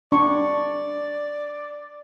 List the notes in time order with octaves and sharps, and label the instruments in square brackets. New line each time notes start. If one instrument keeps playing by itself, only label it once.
[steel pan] D4 C#6 [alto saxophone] D5